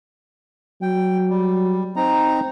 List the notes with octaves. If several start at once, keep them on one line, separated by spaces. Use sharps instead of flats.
F#3 G5
G3
C4 D#4 A#5